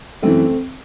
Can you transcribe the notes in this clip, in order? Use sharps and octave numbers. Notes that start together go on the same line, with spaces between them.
F#2 E3 A3 C4